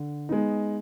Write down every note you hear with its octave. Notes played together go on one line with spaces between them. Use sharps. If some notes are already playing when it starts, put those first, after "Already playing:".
Already playing: D3
G#3 B3 D#4